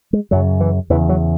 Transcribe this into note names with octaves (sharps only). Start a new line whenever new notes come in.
G#3
F#2 C#3 F#3
E3
E2 C#3 E3
F#3